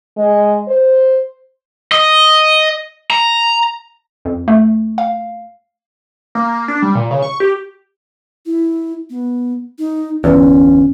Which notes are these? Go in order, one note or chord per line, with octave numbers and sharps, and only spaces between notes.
G#3
C5
D#5
A#5
F2
A3
F5
A#3
D4
G3
A#2
C#3
C#6
G4
E4
B3
D#4
G1 E2 C#4